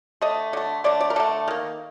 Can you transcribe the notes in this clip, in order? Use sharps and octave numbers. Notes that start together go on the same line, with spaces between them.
D3 A3 D#5
D3 A3
D3 A3 D5
D5
A#4
D3 A3 A4
D#3 A#3